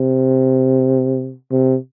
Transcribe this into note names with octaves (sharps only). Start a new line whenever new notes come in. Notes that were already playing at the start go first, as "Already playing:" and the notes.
Already playing: C3
C3